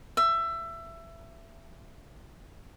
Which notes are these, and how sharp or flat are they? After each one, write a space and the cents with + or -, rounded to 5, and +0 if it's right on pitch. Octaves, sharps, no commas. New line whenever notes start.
E5 +20